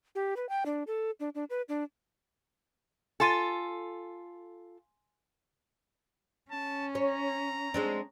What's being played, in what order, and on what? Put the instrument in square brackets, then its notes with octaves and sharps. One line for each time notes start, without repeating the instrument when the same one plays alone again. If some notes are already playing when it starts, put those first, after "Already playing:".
[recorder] G4
B4
G5
D4
A4
D4
D4
B4
D4
[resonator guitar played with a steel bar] F4 A4 [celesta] G#5 C6 D#7
[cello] C#4 [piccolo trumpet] A5
[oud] C#5 [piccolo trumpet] A#5
[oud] G#3 C4 D4